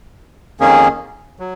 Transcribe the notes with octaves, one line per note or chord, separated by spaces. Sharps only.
F2 D#3 A#3 C#4 G#4
F#3